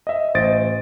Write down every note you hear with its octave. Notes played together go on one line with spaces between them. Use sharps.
D#5 E5
A1 C5 D#5 A6 D7